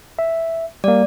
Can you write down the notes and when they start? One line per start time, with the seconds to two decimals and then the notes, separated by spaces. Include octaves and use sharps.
0.19 E5
0.84 G3 A#3 D5